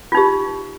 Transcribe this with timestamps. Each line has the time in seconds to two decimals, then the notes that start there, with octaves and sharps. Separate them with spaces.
0.12 F4
0.15 D#4
0.17 G4